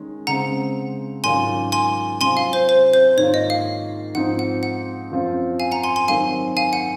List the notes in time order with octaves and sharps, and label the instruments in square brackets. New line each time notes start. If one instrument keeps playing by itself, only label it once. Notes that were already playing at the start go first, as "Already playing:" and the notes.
Already playing: [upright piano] D#3 G#3 C#4
[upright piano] C#3 G#3 C4 [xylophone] F#5 A#5
[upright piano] G#2 D#3 F#3 C#4 F4 [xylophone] G#5 C6
[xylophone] G#5 C6
[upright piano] C3 F#3 C4 F4 [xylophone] G#5 C6
[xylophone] F5
C5
C5
C5
[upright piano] G#2 D#3 A#3 F4 [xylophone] C#5
[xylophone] D#5
F5
[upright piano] G#2 F3 C4 D#4 [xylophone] F#5
[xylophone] F#5
F#5
[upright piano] F#2 F3 C4 F4
[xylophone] F5 G#5
F#5 A#5
G#5 C6
G#5 C6
[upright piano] D#3 F#3 C4 [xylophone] F5 G#5
[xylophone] F5 G#5
F#5